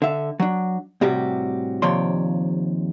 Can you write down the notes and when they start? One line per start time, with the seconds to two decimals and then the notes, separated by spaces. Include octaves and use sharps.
0.02 D3 E5
0.40 F#3 D4
1.01 A2 C3 G3 F#4 G4
1.82 D#2 C3 F3 C#5 D5 C6